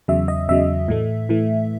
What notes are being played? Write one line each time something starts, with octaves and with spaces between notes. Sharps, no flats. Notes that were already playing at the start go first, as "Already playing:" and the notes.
E2 C#3 F#3 E5
D#5
E2 C#3 F#3 E5
A2 E3 A3
A2 E3 A3